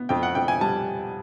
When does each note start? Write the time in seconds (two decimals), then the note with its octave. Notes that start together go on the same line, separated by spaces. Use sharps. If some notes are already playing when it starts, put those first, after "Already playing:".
Already playing: B3
0.09 F2 G5
0.23 F#5
0.35 F2 G5
0.48 G#5
0.61 G3 A5